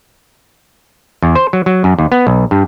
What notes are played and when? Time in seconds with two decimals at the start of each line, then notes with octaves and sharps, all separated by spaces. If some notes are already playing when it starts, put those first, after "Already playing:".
1.22 E2
1.35 C5
1.53 F#3
1.66 F#3
1.84 F#2
1.99 D#2
2.12 B3
2.27 B1
2.51 G2